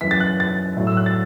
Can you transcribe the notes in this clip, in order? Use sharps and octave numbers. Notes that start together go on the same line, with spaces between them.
F#2 E3 B6
A6
F#6
A6
A2 F#3
E6
F#6
A6